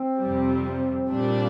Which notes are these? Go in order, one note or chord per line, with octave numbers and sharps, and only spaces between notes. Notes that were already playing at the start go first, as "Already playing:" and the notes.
Already playing: C4
F2 C3 G3
A#2 G3 D4